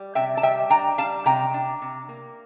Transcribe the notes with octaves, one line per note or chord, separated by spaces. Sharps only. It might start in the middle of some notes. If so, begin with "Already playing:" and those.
Already playing: G3
C3 E5 G5
A5
G3 E5 G5
D4 G5 A#5
G3 F5 A5
C3 G5 A#5
D4
C3
A#3